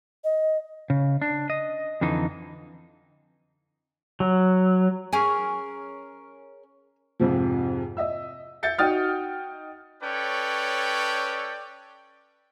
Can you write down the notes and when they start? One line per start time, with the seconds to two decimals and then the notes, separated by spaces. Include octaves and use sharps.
0.24 D#5
0.90 C#3
1.22 D4
1.50 D#5
2.01 F2 D3 E3 D#4
4.20 F#3
5.13 C#4 G#4 A#4 G#5
7.20 F2 G#2 C3 F3
7.97 D#5 E5 E6
8.63 E5 G6 A6 C#7
8.78 D#4 F#4 G5 D#6 F6 A6
10.03 C#4 A4 B4 C#5 D5 G5